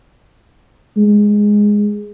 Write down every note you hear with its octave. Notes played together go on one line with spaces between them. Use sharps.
G#3